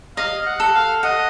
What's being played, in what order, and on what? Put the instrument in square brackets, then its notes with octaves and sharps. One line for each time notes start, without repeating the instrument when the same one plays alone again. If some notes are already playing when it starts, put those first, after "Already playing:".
[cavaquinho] D#5 [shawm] F5
[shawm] F#5
[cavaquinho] A4
[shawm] F5
[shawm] D#5 [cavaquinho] F#5